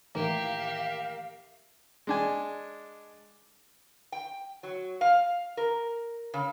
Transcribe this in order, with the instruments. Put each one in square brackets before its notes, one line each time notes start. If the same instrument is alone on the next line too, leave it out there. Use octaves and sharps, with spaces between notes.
[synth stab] A2 D#3 E3 [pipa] A#3 [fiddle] G4 E5 [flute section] A#4 F5
[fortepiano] G#3 D4 G#5
[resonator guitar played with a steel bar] G5
F#3
F5
A#4
C#3